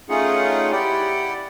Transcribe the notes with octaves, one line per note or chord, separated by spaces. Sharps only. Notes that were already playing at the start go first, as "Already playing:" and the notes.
A3 C#4 D#4 F4 G#4 F#5
E4 G4 D5 F#5 G5